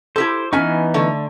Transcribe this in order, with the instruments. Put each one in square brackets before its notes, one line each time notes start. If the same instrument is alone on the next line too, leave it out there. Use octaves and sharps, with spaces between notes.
[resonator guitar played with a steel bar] E4 G4 A4 [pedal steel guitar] C5
[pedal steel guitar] E3 B3 D#4 [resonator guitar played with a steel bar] C#4 G#5
[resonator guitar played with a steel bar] D3 A3